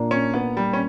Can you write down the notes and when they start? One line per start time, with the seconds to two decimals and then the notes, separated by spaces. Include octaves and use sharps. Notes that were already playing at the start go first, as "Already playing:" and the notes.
Already playing: A#2 A#3 D4
0.11 C#4
0.34 B3
0.57 G3
0.73 C#4